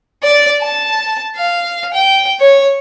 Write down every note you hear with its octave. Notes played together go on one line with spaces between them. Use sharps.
D5
A5
F5
G5
C#5